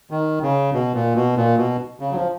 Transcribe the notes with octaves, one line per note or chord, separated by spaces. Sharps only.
D#3
C#3
B2
A#2
B2
A#2
B2
C#3
F#3
F3